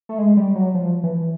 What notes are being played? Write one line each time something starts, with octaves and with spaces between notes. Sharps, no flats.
A3
G#3
G3
F#3
F3
E3